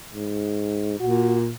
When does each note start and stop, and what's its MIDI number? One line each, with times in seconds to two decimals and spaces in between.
0.14 0.98 44
1.00 1.54 46
1.00 1.36 66